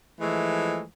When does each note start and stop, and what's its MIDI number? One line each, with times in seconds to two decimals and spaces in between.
0.20 0.82 52
0.20 0.82 53
0.20 0.82 56
0.20 0.82 57